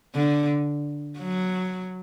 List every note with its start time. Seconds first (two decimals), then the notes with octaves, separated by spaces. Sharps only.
0.15 D3
1.19 F#3